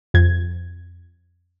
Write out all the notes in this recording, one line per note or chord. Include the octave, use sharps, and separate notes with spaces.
F2 G#6